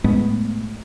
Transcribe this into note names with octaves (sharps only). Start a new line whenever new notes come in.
A2 G#3 A3 B3